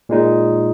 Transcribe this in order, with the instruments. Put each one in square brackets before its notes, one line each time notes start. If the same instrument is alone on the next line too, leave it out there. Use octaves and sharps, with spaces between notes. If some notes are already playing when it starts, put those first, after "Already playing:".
[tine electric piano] A#2 G#3 D#4